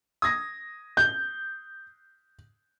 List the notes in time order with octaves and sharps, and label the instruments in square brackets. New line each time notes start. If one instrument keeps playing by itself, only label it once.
[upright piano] D#6 G#6 A#6
[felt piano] G6